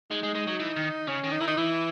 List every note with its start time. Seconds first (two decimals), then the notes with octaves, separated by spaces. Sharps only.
0.10 G#3 D#4
0.23 G#3
0.35 G#3
0.47 F#3
0.59 E3
0.76 D#3
1.08 C#3 C#4
1.24 D#3
1.32 D#4
1.40 D#3 E4
1.47 D#4
1.57 E3 E4